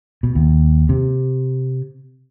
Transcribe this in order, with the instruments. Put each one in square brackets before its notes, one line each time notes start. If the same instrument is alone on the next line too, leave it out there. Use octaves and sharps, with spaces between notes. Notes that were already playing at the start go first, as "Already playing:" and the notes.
[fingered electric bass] B2
D#2
C3